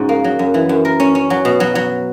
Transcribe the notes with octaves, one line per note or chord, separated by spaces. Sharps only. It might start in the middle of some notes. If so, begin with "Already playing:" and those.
Already playing: G#2 C#3 F#4
A#3
F#3
F#2
E3
F#2
A#4
C#4
C#4
F#3
B2
F#3
F#3